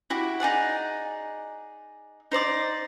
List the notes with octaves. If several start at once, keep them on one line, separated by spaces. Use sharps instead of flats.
E4 F#4 G4
D#4 G#4 D5 F#5
D#4 C5 D5 D6